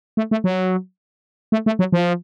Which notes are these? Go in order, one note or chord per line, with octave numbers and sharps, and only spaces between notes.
A3
A3
F#3
A3
A3
F#3
F3